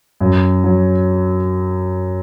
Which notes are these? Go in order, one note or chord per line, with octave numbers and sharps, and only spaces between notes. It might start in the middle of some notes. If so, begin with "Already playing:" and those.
F#2
F#3